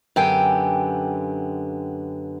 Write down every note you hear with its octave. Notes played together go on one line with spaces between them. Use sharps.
F#2 D3 B3 G4 G5 G#5